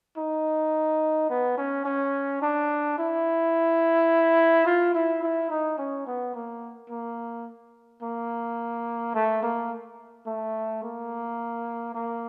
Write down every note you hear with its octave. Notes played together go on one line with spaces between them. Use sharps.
D#4
B3
C#4
C#4
D4
E4
F4
E4
E4
D#4
C#4
B3
A#3
A#3
A#3
A3
A#3
A3
A#3
A#3